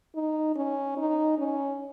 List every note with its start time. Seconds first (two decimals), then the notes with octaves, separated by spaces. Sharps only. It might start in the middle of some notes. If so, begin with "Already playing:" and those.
0.15 D#4
0.56 C#4
0.97 D#4
1.38 C#4